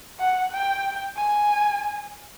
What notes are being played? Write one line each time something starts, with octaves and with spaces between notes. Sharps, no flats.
F#5
G5
G#5